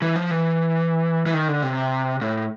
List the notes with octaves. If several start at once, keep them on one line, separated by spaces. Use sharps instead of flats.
E3
F3
E3
E3
D#3
D3
C3
A2